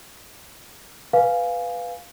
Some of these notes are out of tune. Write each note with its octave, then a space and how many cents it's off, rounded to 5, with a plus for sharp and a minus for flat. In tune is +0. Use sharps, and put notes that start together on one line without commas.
B4 +0 F5 +0 G#5 +0